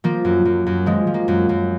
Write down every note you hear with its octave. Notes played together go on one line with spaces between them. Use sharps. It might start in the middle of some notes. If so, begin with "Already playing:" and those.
F3 A#3
F#2
F#2
F#2
F3 G#3
F3
A#3
F#2
F#2